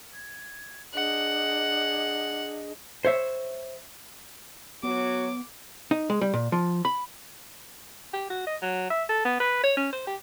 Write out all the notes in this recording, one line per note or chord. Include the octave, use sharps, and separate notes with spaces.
G#6
D4 G#4 D#5 F#5
C5 C#5 E5
F#3 B3 F#4 C#5 D6
D#4
G#3
G3
A#2
F3
B5
G4
F#4
D#5
F#3
E5
A4
B3
B4
C#5
C#4
C5
G4